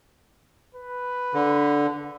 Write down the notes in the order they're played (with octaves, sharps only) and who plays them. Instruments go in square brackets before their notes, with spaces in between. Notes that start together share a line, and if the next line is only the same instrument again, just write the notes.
[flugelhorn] B4
[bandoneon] D3